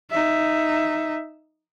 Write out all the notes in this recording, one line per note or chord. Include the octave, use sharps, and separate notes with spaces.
D#4 E5